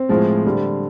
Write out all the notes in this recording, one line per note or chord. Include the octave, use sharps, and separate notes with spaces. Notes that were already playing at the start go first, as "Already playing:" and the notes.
Already playing: C4
A2 F3 G#3
D3 G3